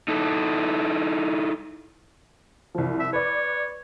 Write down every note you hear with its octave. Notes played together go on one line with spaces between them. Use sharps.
D#4 E4 A4
C2 F3
E5
B4 C#5 D5